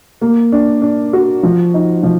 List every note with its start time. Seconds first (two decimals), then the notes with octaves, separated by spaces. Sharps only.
0.21 A#3
0.52 D4
0.82 D4
1.13 F#4
1.43 F3
1.74 D#4
2.03 F3